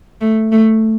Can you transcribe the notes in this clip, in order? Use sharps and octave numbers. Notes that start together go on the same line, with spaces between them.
A3
A3